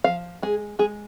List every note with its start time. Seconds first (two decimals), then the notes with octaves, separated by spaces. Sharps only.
0.04 F3 F5
0.43 G#3 G#4
0.79 G#3 G#4